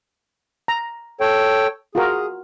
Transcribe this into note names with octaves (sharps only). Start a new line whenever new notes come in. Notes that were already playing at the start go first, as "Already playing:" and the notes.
A#5
A4 C#5 G5
F4 F#4 G#4 A#4